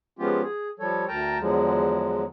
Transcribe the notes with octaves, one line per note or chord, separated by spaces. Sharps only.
F3 G#3 B3 C#4 F4 G4
G#4
F3 G3 A4 C#5
D2 A#4 G5 A5 A#5
E2 D3 F3 F#3 G#3